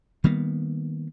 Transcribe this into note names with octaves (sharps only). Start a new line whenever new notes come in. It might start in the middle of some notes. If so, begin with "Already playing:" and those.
D#3 G3 A#3 B3